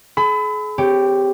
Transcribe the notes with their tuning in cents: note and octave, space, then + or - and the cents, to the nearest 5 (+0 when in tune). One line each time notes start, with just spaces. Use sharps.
G#4 +40 B5 +30 E6 -35
C4 -25 G4 +5 C#5 +0